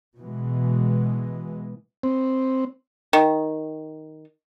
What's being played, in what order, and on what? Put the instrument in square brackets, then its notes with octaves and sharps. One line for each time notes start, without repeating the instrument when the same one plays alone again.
[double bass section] B2 E3 G#3
[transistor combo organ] C4
[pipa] D#3